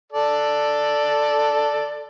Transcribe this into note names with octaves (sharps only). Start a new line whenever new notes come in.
A4 D5